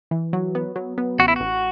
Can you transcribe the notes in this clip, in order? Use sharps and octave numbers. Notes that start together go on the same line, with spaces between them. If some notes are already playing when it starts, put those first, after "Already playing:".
E3
F#3
B3
F#3
B3
A1 F#4
E4
A1 F#4